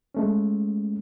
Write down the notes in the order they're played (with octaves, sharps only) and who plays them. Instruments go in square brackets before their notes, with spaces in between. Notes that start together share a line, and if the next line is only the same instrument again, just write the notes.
[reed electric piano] G#3 A3 C#4